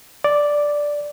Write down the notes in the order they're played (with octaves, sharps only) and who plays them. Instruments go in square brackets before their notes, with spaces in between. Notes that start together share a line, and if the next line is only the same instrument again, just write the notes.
[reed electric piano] D5